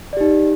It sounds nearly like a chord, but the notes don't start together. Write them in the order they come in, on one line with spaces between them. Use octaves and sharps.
D5 G4 D#4